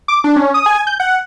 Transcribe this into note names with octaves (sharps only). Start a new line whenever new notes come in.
D6
D4
C#4
D#6
G#5
G6
F#5